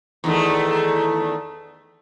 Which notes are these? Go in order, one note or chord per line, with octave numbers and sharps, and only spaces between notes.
E2 D#3 A3